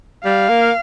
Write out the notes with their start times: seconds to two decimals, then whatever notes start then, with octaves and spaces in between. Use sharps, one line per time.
0.25 G3 F5
0.49 A#3